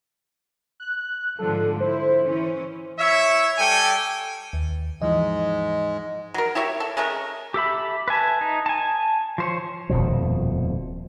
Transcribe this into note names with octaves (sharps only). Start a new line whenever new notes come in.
F#6
G#2 D3 F3 A4
E4 C5
E3 C#4
E4 C#5 E5
G3 A4 G5 G#5
D#2
G#2 E3 F3 G#3 D#5
F#3 A#4
E4 G4 C#5 E5
A4
G#3 A3 C#4 A#4
G4 A4 E5 B5
B4 E5 G#5 A5
D#4
G#5 A5
F3 C5 C#5
D#1 F2 B2 F3